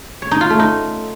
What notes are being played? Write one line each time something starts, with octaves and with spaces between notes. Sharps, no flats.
C#5
D#4
F4
A3
D#4